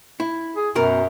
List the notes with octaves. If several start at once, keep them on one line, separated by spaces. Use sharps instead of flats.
E4
G#4
B1 F#2 B2 A#4